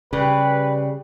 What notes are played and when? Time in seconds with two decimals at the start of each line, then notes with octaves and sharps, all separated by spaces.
0.13 C#3 G3 G4 B4